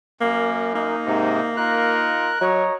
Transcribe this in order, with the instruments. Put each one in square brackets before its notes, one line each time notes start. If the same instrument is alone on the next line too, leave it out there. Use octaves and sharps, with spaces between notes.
[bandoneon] F#2 [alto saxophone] A#3
[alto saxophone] A#3 [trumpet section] D#4
[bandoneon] G#2 C3
[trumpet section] D#4 F4 A#4 [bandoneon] F#6
[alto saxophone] F#3 [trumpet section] C#5 D#5 A#5